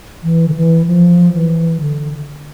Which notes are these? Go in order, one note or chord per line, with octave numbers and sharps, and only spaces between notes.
E3
D3
E3
F3
E3
D3